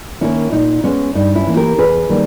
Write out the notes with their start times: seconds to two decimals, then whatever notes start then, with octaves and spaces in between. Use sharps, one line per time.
0.21 D#3 A#3 C#4 E4
0.52 A#2 D#4
0.84 G#3 B3 C#4
1.15 G2 D#4
1.36 C#4 E4
1.47 E3 A#3
1.57 G4 A#4
1.78 E2 G#4 B4
2.09 D#3 G3 A#3